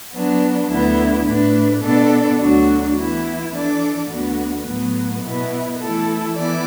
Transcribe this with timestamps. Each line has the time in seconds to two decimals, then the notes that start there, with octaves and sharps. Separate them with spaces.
0.13 F#3 B3 D4
0.70 D2 D3 B3 E4
1.26 A2 A3 D4 B4
1.82 B2 B3 D4 A4 D5
2.39 D2 D3 F#3 D4 F#4
2.96 E3 B3 E4
3.53 E3 D4 A4 D5
4.09 D2 D3 B3 F#4
4.66 A2 F#3 B3
5.21 B2 B3 E4 B4
5.78 E3 A3 E4 A4
6.35 E3 B3 E4 D5